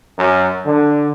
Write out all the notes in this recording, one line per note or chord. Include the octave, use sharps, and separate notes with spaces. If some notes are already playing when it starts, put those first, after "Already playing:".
F#2
D3